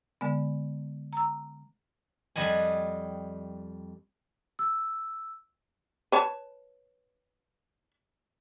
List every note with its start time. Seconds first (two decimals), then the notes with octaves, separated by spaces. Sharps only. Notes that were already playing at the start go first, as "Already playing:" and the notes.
0.21 D3 G#3 B3
1.13 A#5 E6
2.36 F2 G3 D#5 F#5 G#5
4.59 E6
6.12 B4 C#5 A5